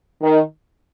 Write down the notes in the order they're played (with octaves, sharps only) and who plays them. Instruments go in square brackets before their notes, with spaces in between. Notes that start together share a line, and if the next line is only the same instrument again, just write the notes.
[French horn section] D#3